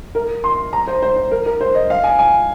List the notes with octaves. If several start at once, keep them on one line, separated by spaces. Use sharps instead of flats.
A#4
C6
A#5
C5
C5
C5
A#4
A#4
C5
D#5
F5
G#5
G#5